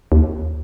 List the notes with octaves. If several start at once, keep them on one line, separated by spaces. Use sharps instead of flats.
D#2